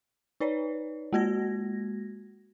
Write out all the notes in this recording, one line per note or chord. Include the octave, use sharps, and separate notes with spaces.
D#4 B4 C#5 D5
G#3 A#3 F#4 G#6 A#6